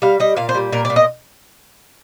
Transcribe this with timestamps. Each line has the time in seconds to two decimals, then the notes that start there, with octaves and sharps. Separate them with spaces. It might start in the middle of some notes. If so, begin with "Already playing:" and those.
0.02 G3 F5
0.20 G3 D#5
0.37 A#2 F5
0.49 C5
0.55 G3
0.72 A#2 A#4
0.85 D5
0.90 A#2
0.96 D#5